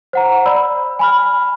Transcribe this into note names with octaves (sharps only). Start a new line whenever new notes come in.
C5 F#5 A#5
D5 B5 E6
G#5 B5 F6